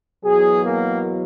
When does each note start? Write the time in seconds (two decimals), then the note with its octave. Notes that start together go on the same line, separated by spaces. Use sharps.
0.24 E2 B2 F#3 G#4
0.63 A#3